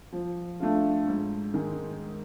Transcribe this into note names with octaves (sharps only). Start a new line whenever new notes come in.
F3
A3 D4 F4
G#2
D#3 G#3